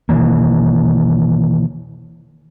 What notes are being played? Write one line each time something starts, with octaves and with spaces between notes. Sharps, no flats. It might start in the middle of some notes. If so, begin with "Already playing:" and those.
B2 D#3 E3 A#3